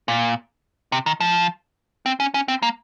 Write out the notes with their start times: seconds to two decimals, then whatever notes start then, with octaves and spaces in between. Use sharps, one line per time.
0.08 A#2
0.92 C3
1.06 D#3
1.20 F3
2.06 C4
2.20 C#4
2.34 C#4
2.48 C4
2.62 A#3